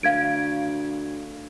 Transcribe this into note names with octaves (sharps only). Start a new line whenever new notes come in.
D2 F5 G#6 D7